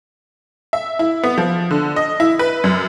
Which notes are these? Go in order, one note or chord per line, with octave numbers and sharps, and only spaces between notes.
E5
E4
B3
F3
D3
D#5
E4
B4
F#2